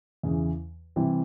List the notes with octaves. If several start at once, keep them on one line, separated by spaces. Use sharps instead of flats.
E2 C#3 E3
C3 E3 G3 C4 E4